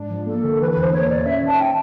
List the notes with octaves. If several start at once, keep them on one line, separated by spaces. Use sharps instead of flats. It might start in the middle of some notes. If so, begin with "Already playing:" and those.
Already playing: G#2 D4
F3
A#3 A4
D3
E3 B4
B4
E2
C5
A#3 C#5
A#2 D5
C#4 E5
D#3
A5
C#4 G5